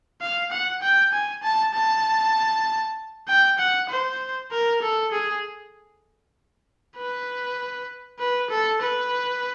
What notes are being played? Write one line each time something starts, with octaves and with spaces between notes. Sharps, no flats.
F5
F#5
G5
G#5
A5
A5
G5
F#5
C5
A#4
A4
G#4
B4
B4
A4
B4